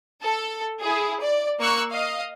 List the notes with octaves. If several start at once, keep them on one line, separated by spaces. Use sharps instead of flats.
A4
E4 G#4
D5
A#3 C#6 E6 F#6
D#5 F5